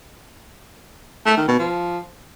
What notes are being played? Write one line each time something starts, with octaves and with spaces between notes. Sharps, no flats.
A3
D#3
B2
F3